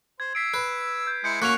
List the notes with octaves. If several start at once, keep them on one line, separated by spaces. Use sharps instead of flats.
C5 G#6
E6 B6 C7 D7
B4
G6
G#3 E4 G6 C#7
A#3 C#4 F#4 C#5 F#6 F7